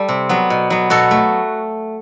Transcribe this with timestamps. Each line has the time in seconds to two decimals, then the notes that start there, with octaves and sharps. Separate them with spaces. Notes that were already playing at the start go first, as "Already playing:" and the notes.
Already playing: G3 A4
0.09 C3
0.29 F#3 B3
0.50 B2
0.70 F#3 B3
0.90 B2 F#4 A4
1.11 A3